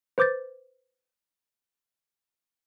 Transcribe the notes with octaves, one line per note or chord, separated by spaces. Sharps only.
B4 C5 D6 G6 A6